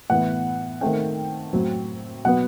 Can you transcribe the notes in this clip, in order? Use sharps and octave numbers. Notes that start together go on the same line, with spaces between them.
A2 E3 B3 F#5
D#3 A3 C4 G5
A2 F#3 C4
B2 F#3 B3 F#5